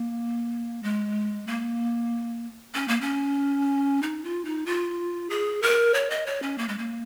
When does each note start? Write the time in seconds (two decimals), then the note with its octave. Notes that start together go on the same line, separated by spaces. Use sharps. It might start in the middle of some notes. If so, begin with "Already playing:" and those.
Already playing: A#3
0.83 G#3
1.47 A#3
2.74 C#4
2.88 A#3
3.01 C#4
4.03 D#4
4.24 F4
4.45 D#4
4.66 F4
5.30 G#4
5.62 A#4
5.94 C#5
6.10 D#5
6.26 C#5
6.42 C#4
6.58 A#3
6.68 G#3
6.78 A#3